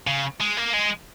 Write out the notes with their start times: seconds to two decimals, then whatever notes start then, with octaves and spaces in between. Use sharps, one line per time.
0.07 C#3
0.40 G#3
0.57 A#3
0.73 G#3